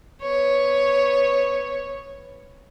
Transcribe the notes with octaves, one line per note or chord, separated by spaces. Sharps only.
B3 C#5